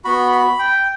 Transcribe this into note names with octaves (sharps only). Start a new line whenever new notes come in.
B3 F#4 B5
B5
G5